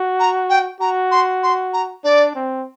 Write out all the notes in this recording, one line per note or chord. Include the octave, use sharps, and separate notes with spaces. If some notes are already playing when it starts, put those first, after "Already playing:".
Already playing: F#4
A#5
G5
F#4 A#5
C6
C6
A#5
D4 D5
C4